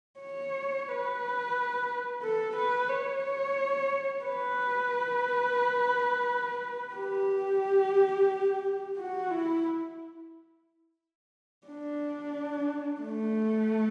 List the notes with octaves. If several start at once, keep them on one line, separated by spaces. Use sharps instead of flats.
C#5
B4
A4
B4
C#5
B4
G4
F#4
E4
D4
A3